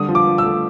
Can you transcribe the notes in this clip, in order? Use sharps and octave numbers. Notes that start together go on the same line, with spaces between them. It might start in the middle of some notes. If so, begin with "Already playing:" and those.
Already playing: D3 G3 D#6
F3
D6
F3
E6
A3